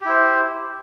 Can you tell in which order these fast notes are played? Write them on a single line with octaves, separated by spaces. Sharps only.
G4 E4 C5